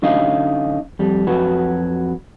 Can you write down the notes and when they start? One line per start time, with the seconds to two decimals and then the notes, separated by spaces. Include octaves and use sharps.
0.02 D3 F#3 C#4 D#4 D#5 F5
0.99 F2 G3
1.27 F2 F#3 F#4 B4